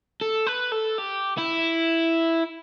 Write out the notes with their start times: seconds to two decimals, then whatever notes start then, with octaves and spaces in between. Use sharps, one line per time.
0.21 A4
0.47 B4
0.72 A4
0.98 G4
1.37 E4